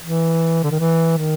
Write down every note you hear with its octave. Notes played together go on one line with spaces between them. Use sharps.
E3
D3
D#3
E3
D#3